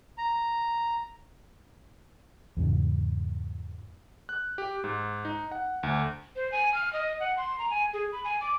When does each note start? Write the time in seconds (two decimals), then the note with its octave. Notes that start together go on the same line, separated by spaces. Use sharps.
0.18 A#5
2.57 E2 G#2 C#3
4.29 F#6
4.58 G4
4.84 G#2
5.25 D#4
5.51 F#5
5.83 D2
6.36 C5
6.52 G#5
6.74 F6
6.93 D#5
7.20 F#5
7.37 C6
7.59 A#5
7.70 G#5
7.93 G#4
8.12 B5
8.24 G#5
8.41 D6